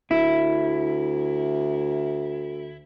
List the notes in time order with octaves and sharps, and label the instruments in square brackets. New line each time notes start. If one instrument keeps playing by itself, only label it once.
[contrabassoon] D2 [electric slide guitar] E4